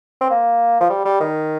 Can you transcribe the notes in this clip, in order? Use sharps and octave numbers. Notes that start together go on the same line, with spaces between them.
C4
A#3
F3
G3
G3
D#3